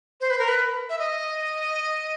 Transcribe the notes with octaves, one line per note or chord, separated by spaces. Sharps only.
C5
B4
A#4
B4
E5
D#5